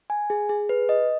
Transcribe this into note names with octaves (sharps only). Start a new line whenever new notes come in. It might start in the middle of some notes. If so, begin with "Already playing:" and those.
G#5
G#4
G#4
B4
D#5